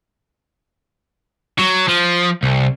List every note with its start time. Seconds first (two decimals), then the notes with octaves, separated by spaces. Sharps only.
1.59 F#3
1.89 F3
2.43 C2